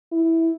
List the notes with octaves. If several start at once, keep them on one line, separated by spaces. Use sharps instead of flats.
E4